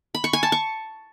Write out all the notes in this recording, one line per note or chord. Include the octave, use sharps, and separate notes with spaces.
B5
C#6
G#5
A5
C#6